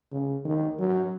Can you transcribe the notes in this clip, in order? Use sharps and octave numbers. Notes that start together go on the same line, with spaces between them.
C#3
D#3
F#3